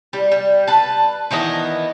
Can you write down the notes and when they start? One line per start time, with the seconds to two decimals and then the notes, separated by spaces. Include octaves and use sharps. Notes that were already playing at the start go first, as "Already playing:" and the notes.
0.13 G3
0.32 G3
0.67 B4 A5
1.31 D#3 E3 B3 D#5